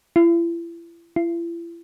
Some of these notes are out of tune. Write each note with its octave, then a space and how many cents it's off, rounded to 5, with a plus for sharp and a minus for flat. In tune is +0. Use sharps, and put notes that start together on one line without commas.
E4 +40
E4 +40